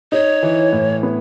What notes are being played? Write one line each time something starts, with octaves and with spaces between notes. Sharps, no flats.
D#4 C#5
E3
A2
B3